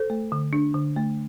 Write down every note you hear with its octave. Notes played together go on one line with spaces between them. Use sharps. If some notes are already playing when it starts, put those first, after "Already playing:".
Already playing: A4 C5
A3
D3
D4
D3
A3